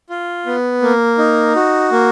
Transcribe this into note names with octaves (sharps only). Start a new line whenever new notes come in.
F4
B3
A#3
D#4
F#4
A#3